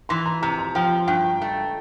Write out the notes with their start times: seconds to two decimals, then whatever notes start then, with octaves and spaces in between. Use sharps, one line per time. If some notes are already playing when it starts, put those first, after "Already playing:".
0.09 E3 C6
0.26 A#5
0.42 C3 A#5
0.59 A#5
0.75 F3 G5
1.08 G2 G5
1.41 A3